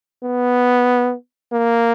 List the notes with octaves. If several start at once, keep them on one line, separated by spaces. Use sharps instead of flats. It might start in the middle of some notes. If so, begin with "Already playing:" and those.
B3
A#3